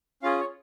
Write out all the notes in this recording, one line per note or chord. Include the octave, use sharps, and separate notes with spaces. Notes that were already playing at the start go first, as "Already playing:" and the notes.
C#4 F4 G#4 F5
C#5